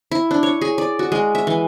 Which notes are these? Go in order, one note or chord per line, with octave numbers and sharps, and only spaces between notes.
E4
D4
C#5
G#4
D5
F#4
G#3
E5
E3